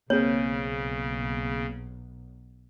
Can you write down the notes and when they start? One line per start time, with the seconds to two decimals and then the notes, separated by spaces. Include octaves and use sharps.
0.10 B1 C#3 A#3 C4 G#4 C#5